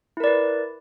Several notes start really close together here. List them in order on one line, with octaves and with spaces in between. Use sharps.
E4 A#4 D5 B4